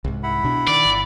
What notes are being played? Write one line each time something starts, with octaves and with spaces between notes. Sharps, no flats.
C2 G#2
E4 F#5 B5
B2 D4
D#3 D5
G1